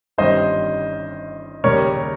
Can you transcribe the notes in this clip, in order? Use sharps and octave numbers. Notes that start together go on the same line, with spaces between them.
G1 G2 D#3 G3 C#4 C5 D#5
D#2 C#3 G3 C#4 A#4 C#5